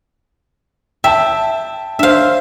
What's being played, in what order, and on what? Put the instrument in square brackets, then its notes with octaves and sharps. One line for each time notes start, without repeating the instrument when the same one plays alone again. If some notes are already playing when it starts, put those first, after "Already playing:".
[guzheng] E5 [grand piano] G5 A5
[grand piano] D4 C5 [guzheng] E5 F5